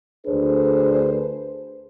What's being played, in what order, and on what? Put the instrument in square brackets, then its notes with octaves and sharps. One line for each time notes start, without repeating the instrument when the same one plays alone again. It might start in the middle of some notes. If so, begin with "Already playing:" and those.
[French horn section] D2 D4 G#4 A4 B4 C5